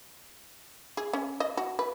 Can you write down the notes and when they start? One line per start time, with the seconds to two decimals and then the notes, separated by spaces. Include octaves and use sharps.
0.97 G#4
1.13 C#4
1.40 D#5
1.57 F#4
1.79 B4